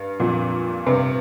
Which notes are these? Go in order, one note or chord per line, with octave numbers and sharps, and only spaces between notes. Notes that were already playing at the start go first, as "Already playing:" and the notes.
Already playing: G2
F2 A#2
G2 C3